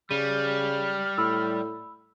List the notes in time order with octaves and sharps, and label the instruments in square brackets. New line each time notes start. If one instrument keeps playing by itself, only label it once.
[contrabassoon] C#3 [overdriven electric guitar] G3 [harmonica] F6 [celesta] D#7
[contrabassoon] A2 [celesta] B5 E6